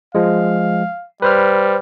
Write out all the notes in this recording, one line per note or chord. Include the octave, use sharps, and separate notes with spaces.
F3 G#3 F5
G3 B4 C5 F6